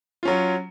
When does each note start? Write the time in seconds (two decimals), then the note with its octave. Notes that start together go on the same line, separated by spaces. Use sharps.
0.23 F#3 C#4 F4